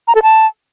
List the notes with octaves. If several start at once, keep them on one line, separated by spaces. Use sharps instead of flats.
A#5
A4
A5